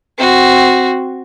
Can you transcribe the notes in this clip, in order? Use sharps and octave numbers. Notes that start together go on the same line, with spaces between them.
C4 F#4